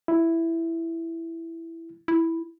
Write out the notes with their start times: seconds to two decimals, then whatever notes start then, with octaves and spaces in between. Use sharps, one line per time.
0.08 E4
2.08 E4